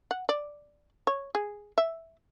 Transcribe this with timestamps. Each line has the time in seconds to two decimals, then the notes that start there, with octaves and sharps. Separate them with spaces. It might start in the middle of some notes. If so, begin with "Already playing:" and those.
0.11 F#5
0.29 D5
1.07 C#5
1.35 G#4
1.78 E5